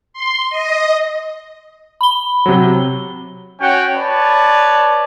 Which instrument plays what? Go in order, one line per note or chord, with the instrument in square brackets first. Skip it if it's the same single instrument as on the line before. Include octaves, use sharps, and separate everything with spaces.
[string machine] C6
D#5
[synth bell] B5 G7
[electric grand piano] C3 F#3
[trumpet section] C#4 F#4 C#5 F#5 G5
B4 C#5 D5 A5